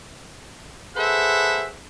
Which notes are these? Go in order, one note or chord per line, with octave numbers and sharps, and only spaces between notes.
G#4 A4 B4 C5 E5 F#5